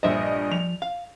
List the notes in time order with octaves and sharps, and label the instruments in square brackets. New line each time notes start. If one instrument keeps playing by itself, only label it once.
[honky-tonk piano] A#1 G2 D#5 [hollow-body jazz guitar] C5 E5
[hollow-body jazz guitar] F3 [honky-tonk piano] F7
[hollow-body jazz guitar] F5